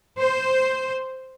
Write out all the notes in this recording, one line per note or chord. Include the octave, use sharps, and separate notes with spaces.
C5